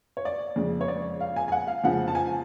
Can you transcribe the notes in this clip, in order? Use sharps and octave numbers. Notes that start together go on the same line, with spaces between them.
C#5
D5
F2 C#3 G#3
C#5
D5
F5
G#5
G#5
F#5
F5
F2 C#3 F3 F#5
A5
G#5